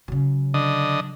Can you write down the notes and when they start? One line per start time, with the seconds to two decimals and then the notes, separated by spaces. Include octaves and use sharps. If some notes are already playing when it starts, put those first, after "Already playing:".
0.08 C#3 F#3
0.54 D3 D#5